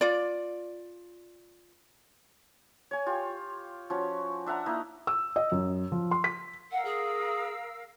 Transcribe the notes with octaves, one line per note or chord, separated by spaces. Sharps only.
F4 D5
C#5 G#5
F4 G4
F3 C#4 F#4
D4 E5 F#5 A#5
A#3 D#4 E4 D#5
E6
D#5
F#2
F3
C6
B6
A#4 F5 F#5 E6
G#4